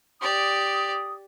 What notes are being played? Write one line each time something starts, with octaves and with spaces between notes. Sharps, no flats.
G4 D5 D#6